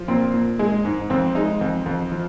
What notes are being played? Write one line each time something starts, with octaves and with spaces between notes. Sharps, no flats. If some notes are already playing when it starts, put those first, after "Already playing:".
Already playing: F3
A#2 C4
A#2
G#3
G#2
F2 C4
G#3 D#4
F2
F2
F3